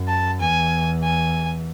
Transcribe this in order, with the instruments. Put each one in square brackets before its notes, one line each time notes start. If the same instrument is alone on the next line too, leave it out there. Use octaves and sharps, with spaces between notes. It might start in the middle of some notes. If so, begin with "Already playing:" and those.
Already playing: [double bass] F#2
[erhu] A5
[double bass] E2 [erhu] G#5
[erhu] G#5